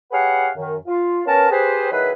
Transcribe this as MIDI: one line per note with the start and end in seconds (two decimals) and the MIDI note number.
0.12 0.49 67
0.12 0.49 68
0.12 0.49 71
0.12 0.49 73
0.12 0.49 77
0.12 0.49 78
0.56 0.76 42
0.56 0.76 51
0.87 1.21 65
1.26 1.49 59
1.26 1.49 61
1.26 1.49 70
1.26 1.49 81
1.50 1.87 67
1.50 1.87 68
1.50 1.87 71
1.50 1.87 72
1.91 2.12 47
1.91 2.12 51
1.91 2.12 54
1.91 2.12 64
1.91 2.12 68
1.91 2.12 71